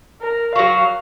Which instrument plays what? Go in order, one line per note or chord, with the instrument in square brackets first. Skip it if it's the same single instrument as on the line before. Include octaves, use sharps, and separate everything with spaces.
[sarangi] A#4
[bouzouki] F#3 F#4 [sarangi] F5